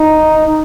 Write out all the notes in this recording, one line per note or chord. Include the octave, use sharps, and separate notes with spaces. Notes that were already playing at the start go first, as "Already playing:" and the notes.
Already playing: D#4